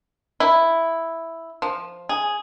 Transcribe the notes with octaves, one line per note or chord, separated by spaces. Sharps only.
E4
F3
G#4